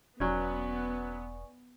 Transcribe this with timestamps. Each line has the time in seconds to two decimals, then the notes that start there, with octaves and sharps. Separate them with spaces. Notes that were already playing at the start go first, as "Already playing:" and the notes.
0.20 E1 F#3 B3 C#4 D5 G#5 C#6